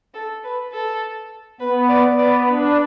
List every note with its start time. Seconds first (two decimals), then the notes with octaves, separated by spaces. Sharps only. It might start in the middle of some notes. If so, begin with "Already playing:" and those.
0.14 A4
0.44 B4
0.72 A4
1.60 B3 B4
1.89 D5
2.03 B3
2.18 D5
2.47 D4 B4